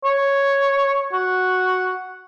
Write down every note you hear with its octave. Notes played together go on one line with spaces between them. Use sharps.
C#5
F#4